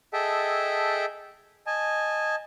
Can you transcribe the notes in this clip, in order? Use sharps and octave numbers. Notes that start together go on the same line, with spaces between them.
G#4 A4 D#5 E5 G5 A5
D#5 G#5 A5